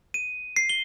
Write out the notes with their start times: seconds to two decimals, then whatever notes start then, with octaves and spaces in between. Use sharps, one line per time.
0.14 D#7
0.56 C7
0.69 G7